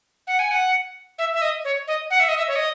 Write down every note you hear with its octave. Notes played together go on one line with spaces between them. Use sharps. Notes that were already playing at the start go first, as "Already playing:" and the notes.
F#5
G#5
F#5
E5
E5
D#5
C#5
D#5
F#5
E5
D#5
E5
C#5
D#5